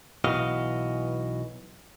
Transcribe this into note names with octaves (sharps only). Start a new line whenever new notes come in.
B1 B2 E3 F#4 D#5 F5